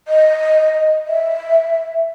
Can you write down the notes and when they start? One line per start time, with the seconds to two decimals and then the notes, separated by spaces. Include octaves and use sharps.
0.08 D#5
1.07 E5